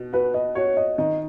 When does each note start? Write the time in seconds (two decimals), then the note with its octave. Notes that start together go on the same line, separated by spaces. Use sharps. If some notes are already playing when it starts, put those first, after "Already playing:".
Already playing: B2
0.13 F#4 B4
0.34 D#5
0.55 F#4 C#5
0.77 D#5
0.98 D#3 D#5